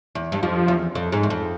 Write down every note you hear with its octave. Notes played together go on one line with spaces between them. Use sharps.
E2
G2
F2 F3
E2
F2
G#2
E2
F2